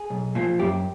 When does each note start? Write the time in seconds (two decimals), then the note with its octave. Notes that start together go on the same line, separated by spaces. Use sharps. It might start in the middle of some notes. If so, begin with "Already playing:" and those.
Already playing: G#4
0.10 B1
0.35 A#2 F3
0.59 F#2 G4